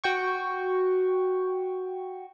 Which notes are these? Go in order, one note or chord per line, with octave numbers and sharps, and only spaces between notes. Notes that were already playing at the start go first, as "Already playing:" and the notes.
F#4 G5 C#6